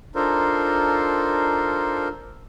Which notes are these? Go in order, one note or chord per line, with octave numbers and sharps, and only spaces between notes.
D4 D#4 F4 A4 A#4 C5